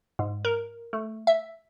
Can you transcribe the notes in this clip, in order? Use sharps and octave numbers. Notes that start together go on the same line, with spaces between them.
G#2
A#4
A3
E5